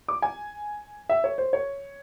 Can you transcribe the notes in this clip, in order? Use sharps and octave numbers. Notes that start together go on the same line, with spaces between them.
D6
G#5
E5
C#5
C5
C#5